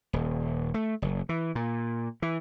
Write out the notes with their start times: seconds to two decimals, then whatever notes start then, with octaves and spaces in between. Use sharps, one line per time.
0.13 D#1
0.74 A3
1.02 F#1
1.29 E3
1.55 A#2
2.22 E3